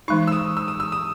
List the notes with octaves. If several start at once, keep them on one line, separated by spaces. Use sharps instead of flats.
E3 G#3 D#4 C#6
E6
D#6
E6
D#6
E6
D#6